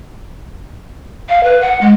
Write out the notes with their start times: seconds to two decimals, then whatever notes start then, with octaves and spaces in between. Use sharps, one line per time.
1.29 F5
1.44 B4
1.61 F#5
1.81 G#3